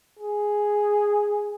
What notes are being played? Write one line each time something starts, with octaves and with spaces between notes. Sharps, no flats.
G#4